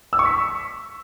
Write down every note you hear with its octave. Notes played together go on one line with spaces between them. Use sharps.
E6
C#6
B6